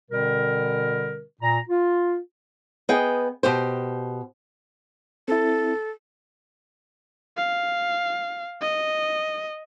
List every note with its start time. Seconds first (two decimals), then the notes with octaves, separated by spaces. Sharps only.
0.11 B2 D3 G3 C4 A#4
1.42 A#2 A#5
1.68 F4
2.89 B3 G#4 D#5 G5
3.43 B2 G4 C5
5.28 C4 E4 A4
7.37 F5
8.61 D#5